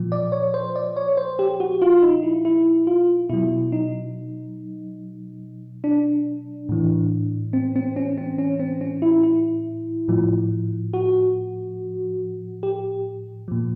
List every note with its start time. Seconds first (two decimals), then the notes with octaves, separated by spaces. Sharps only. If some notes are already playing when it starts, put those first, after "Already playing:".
Already playing: A#2 F3
0.12 D5
0.32 C#5
0.54 C5
0.76 D5
0.96 C#5
1.17 C5
1.39 G4
1.60 F#4
1.82 F4
2.02 D#4
2.23 E4
2.45 E4
2.87 F4
3.29 B2 F#3 E4
3.72 D#4
5.84 D4
6.69 A2 E3
7.53 C4
7.76 C4
7.96 C#4
8.18 C4
8.38 C#4
8.59 C4
8.81 C#4
9.02 E4
9.23 E4
10.08 A2 F3
10.93 F#4
12.63 G4
13.48 A#2 F3